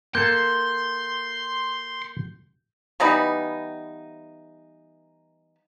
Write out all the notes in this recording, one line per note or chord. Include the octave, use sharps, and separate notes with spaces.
A#3 A4 A5 C6 G6
E3 G3 B3 D#4